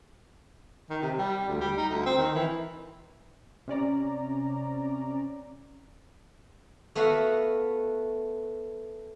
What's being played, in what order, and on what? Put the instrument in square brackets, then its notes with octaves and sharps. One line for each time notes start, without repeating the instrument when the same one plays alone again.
[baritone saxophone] D#3
C3
G3
D2
G3
D#4
D2
C4
D#3
E3
[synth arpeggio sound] C3 C#4 D5 A#5
[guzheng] A3 B3 F#4 F5 F#5